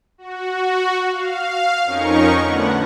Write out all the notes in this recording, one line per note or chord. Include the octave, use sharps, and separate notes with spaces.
F#4
F5
F2 C#4 D#4 A#4 C#6
A2 D3 B3 F#5